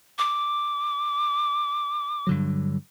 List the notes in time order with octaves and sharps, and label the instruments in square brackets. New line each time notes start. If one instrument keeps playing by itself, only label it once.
[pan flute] D6
[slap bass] G2 D3 F#3